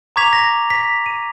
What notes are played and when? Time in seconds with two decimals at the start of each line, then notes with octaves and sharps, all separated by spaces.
0.16 A#5 C#6 D6 G#6 B6 F7
0.33 A#6
0.70 B6
1.06 D#7